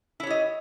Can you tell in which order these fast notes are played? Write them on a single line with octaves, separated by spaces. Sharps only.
E4 C#5 G4 D#5